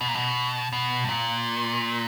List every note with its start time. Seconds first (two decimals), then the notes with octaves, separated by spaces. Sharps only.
0.01 B2
0.08 A#2
0.15 B2
0.73 B2
1.04 G2
1.09 A#2